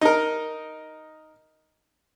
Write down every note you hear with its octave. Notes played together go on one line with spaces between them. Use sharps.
D#4 A#4